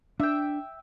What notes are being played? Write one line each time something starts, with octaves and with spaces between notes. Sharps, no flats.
D4 E5 G5